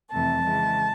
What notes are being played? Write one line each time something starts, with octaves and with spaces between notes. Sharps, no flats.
F2 C3 E3 A3 A5
C#3 E3 G#3